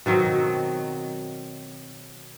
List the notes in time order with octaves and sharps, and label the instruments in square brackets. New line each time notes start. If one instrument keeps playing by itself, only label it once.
[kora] B2 D#3 F#3 C4